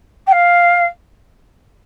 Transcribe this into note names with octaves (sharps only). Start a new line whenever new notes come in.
G5
F5